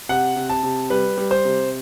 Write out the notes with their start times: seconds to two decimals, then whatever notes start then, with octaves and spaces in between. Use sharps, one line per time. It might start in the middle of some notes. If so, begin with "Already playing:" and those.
0.09 C3 F#5
0.36 C3
0.49 A5
0.63 C3
0.90 G3 B4
1.17 G3
1.31 C5
1.45 C3